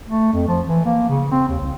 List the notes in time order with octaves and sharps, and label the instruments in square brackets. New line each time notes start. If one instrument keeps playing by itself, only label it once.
[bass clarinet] A3
F2
F3
E3
A#3
C#3
C4
D#2
C2